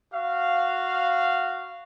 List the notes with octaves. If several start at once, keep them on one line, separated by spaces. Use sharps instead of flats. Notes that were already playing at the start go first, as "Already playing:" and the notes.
F#4 F5